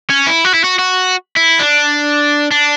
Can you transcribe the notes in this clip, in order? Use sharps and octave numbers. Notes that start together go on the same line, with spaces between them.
C#4
E4
F#4
E4
F#4
F#4
E4
D4
D4